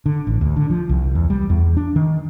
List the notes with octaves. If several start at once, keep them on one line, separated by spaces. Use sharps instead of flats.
D3
A1
D2
D3
F3
C2
E2
G3
E2
D4
D#3